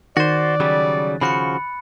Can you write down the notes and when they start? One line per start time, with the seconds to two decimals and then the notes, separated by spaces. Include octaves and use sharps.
0.17 D#3 F#4 C5 D5 F#6 A6
0.60 C#3 F#3 G3
1.21 C#3 F3 F#4 B5 F#6 C#7